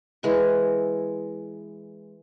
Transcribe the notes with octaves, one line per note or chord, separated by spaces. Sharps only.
E3 G#3 C#6